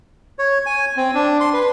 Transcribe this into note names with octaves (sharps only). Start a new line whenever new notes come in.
C#5
G#5
C4
D4
C6
B4